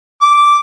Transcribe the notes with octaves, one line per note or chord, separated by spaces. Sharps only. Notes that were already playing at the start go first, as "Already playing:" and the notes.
D6